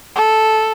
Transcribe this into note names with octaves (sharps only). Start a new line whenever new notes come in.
A4